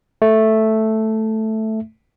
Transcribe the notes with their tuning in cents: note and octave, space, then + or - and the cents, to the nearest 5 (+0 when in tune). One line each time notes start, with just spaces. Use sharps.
A3 +0 E5 +0